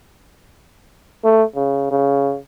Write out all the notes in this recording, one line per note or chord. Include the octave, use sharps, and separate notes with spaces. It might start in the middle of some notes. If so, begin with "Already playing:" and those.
A3
C#3
C#3